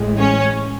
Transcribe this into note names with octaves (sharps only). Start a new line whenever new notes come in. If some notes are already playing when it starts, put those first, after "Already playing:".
Already playing: A1 A2 G#3
C#4 C#5